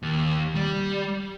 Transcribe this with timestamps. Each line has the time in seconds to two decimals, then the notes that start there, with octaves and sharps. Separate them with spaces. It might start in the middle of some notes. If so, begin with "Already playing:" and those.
0.03 D#2
0.55 G3